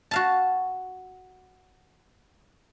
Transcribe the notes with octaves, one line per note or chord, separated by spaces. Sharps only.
F#4 F5 A5